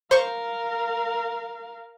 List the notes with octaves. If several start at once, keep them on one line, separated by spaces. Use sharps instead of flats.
A#4 C5 F5 C#6